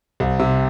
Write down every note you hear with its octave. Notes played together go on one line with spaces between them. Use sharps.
C2
C3